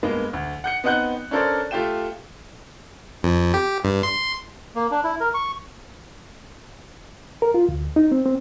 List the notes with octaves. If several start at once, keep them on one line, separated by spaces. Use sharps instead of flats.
G2 G#3 A#3 B3
D2
F#5 G6 C#7
B3 C4 D#4 F#5 F#6 G6
C#4 D4 A4 A#4 C5 D5
A3 F4 G4 F5 G5 E7
F2
G4
G2
C6
A#3
D4
E4
A#4
C#6
A#4
F4
D2
D#4
C4
C4